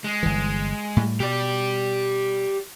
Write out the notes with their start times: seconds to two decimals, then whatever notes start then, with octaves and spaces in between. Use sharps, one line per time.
0.04 G#3
0.23 G1 E3
0.97 A2 G3
1.20 B2 G4 D5